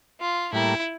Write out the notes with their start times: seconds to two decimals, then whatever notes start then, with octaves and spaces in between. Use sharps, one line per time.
0.20 F4
0.53 A2 G3 A#3 E4